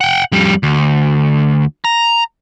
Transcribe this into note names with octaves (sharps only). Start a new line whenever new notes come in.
F#5 G5
F2 G3
D2
A#5